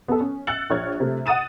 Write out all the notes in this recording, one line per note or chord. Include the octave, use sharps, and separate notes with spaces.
B3 A4
C#4
E6 F#6 A6 C#7 F#7
A#1 C#5 F6 G#6
C3 A3
F#5 D#6 A6 D#7 E7